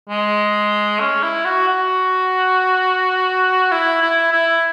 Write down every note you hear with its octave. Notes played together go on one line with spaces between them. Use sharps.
G#3
C#4
E4
F#4
F#4
E4
E4
E4